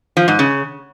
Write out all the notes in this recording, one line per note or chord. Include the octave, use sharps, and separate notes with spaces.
F3
G#2
C#3